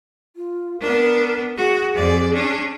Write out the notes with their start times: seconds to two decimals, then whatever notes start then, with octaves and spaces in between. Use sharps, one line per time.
0.36 F4
0.81 B3 D4 A#4
1.57 F#4 G#4
1.95 F2 D5
2.33 C#4 D4